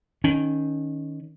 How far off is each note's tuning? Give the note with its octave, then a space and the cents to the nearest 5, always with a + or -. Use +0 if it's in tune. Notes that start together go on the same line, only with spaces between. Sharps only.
D#3 +0 C#4 +10